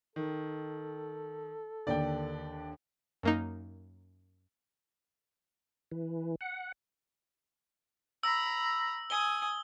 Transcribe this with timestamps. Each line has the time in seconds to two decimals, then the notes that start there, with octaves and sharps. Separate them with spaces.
0.16 D#3 A4
1.87 D#2 D3 D5 G5
3.23 F#2 A#3 D#4
5.92 E3
6.41 F#5
8.23 A#5 B5 E6
9.10 G#5 D#6 G7